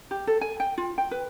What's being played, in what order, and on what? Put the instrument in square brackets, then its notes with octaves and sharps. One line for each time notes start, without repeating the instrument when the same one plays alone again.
[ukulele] G4
A4
G#5
G5
F4
G5
B4